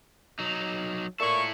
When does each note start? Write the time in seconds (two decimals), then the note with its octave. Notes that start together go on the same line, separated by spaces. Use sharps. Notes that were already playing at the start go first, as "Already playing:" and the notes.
0.39 F#3 D#4
1.20 A#2 E4 A4 E5 C#6